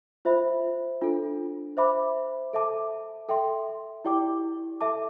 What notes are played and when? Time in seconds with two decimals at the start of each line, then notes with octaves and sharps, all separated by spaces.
0.25 F4 C5 E5 B5
1.02 D4 F4 A4
1.77 C5 E5 B5 D6
2.53 A4 E5 A5 D6
3.29 A4 E5 G5 C6
4.05 E4 G4 D5 G5 D6
4.81 A4 E5 A5 D6